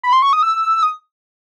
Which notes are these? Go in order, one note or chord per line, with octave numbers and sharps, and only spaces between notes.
B5
C6
C#6
D#6
E6
D#6